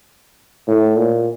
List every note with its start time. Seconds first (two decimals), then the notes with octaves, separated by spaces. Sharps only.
0.68 A2
0.97 A#2